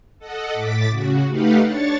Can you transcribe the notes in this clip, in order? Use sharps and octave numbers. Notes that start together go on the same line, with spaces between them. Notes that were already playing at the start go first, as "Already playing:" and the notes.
A4 D#5 F#5
A2 D6 A6 B6
C#3 F#4
A3 D#4 G4 B4 F5 F#5
D4 C#5 C#6 A6